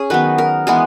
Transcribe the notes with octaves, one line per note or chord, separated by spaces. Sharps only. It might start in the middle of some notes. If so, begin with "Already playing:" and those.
Already playing: C#4 G#4
D#3 F#3 B3 B4
A#4
E3 G#3 B3 G#4